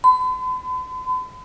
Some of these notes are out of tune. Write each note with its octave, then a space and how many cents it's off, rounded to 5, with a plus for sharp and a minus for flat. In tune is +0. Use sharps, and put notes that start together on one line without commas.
B5 +45